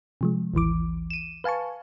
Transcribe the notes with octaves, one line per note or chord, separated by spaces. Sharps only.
C3 F3 G#3
A1 D#2 E3 D6
D#7 E7
B4 F5 G#5 A5 C#6